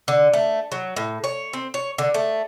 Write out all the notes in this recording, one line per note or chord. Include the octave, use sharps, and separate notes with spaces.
D3
A3
F#3
A2
C#5
C4
C#5
D3
A3